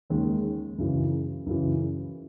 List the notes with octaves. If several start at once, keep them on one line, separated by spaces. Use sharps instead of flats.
D#2 D#3 G#3 C#4
F#2 C#3 E3
F#2 C#3 E3